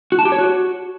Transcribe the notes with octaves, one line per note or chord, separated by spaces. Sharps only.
F#4
A5
G4
C#5
F#4